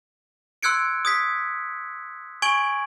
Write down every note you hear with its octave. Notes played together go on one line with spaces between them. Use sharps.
C6 E6 F#6 G#6 C#7 D7
D#6 G#6 B6
G#5 C#6 G#6 D7 F#7